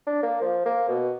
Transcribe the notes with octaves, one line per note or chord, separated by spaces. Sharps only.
D4
A#3
F3
A#3
B2